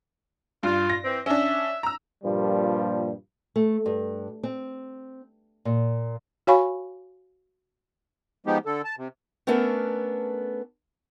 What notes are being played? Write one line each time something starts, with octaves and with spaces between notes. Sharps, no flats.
G2 F4
A#6
E3 C4
C#4 D4 E5
A#5 E6
G2 A#2 F3 G3 A#3
A3
G2
C4
A#2
F#4 C#5 F5 G#5 B5 C#6
F3 G#3 B3 D#4 G4
D3 A4
A5
C3
A3 B3 C#4 D4 A4 A#4